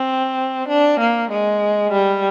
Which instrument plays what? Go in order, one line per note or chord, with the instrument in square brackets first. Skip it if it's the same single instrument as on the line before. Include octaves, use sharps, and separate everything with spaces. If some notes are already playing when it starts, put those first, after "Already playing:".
Already playing: [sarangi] C4
D4
A#3
G#3
G3